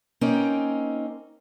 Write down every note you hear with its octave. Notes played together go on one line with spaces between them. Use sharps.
A#3 C4 C#4 D#4